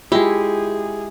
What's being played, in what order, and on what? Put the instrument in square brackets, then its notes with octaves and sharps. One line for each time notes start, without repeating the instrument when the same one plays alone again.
[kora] G#3 E4 [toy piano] F4 [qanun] G4 [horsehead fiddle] G#4